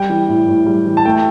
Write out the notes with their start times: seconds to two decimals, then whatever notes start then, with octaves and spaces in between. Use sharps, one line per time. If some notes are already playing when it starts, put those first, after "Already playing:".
Already playing: G3 G5
0.09 E3
0.28 A2
0.48 A2
0.66 G3
0.86 E3
0.97 A5
1.05 A3 G5